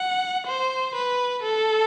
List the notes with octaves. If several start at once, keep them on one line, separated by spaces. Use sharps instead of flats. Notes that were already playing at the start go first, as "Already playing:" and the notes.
Already playing: F#5
C5
B4
A4